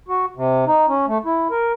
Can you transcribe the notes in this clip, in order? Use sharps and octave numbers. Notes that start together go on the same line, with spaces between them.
F#4
C3
D#4
C#4
A3
E4
A#4